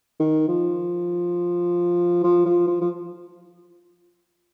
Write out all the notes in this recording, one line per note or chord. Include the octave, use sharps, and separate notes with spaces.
D#3
F3
F3
F3
F3
F3